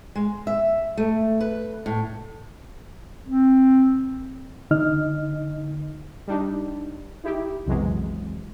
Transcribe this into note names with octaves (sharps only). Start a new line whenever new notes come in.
G#3
E5
A3
B4
A2
C4
D3 D#4 D#5 F6
G3 D4 D#4
D#4 E4 G4
B1 F2 C3 E3 F#3 G#3